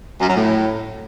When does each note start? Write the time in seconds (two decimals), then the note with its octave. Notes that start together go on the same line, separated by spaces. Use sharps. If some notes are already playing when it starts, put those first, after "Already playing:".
0.21 F#2
0.28 F#3
0.36 A2